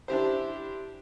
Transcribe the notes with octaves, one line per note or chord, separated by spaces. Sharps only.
D4 E4 G4 C5